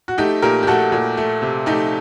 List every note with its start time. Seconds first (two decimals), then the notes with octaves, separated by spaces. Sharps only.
0.08 F#4
0.18 A3 D#4 G4
0.42 A#2 G4 A#4
0.63 G4
0.67 A3 F#4 A4
0.92 A#2
1.17 A3
1.42 C3
1.66 A3 D#4 G4